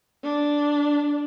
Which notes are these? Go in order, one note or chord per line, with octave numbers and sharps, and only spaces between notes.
D4